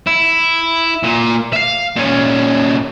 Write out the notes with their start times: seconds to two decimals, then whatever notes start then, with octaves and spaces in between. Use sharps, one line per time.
0.07 E4
1.03 A#2
1.53 E5 F5
1.96 A#2 C#4